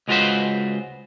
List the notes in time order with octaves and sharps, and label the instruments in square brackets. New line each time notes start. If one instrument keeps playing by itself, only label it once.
[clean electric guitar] C#2 G#3 F4 F#4 B4 C5